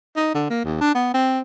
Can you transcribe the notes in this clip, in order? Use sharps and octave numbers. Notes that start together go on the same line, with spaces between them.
D#4
D3
A#3
D#2
D4
B3
C4